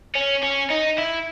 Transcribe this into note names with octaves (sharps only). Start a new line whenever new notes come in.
C#4
C#4
D#4
E4